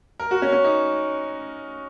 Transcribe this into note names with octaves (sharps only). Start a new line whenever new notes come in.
A#4
F#4
C#4
C#4
D#4